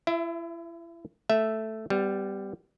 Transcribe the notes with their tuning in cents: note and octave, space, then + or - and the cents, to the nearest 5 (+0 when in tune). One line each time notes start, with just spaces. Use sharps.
E4 +35 E5 +0
A3 +0 E5 +0
G3 +0 B3 +30